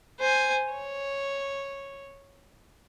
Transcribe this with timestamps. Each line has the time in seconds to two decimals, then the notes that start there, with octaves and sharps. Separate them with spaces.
0.20 C5 G#5
0.72 C#5